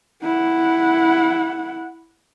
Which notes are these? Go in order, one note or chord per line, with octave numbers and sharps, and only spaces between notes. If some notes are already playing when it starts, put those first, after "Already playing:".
E4 F#5